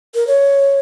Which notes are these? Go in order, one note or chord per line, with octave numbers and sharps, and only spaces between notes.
A#4
C#5